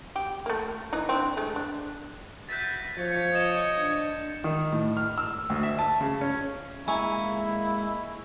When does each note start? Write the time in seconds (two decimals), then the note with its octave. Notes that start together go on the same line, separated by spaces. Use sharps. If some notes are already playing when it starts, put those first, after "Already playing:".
0.16 G4
0.46 A3 A#3
0.93 E3 D#4
1.09 C4 D4
1.37 G#3 A3
1.56 D4
2.49 F#4 B4 E5 G6 A6
2.98 F3 C#5
3.34 D#5 C#7 E7
3.79 D4
4.44 D#3
4.72 A2
4.97 F6
5.18 E6
5.50 D2
5.63 E5
5.79 A5
6.01 C#3
6.21 C#4
6.88 G#3 A#3 E4 G#5 A#5 C#6